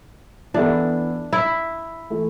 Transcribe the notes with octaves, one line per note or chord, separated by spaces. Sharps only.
E3 B3 D4 E4 A4
E4
E3 A3